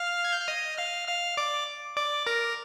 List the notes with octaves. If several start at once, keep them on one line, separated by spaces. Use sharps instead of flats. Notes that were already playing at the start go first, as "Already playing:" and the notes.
Already playing: F5 F6
G#6
G6
F6
D#5 D#6
F5 F6
F5 F6
D5 D6
D5 D6
A#4 A#5